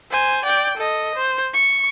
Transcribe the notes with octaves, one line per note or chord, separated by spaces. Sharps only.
C5 G#5
D5 G5
A4 D#5
C5
C#6